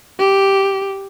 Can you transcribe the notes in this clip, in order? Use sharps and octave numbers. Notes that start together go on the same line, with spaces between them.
G4